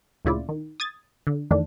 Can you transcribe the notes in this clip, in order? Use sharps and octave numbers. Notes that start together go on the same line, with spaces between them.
D2 A#2 C#3 E4 F4 D5
D#3
D#6 G#6 A6
D3
F2 D#3 E3 A3 D4